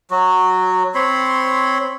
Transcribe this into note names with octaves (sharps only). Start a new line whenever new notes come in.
F#3 F#4
C4 C#5 B5 C6